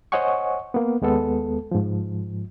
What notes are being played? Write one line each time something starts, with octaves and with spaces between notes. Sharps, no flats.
C5 C#5 D#5 F#5 G#5 C#6
A#3 B3
D#2 G#3 B3 A4
G#2 F3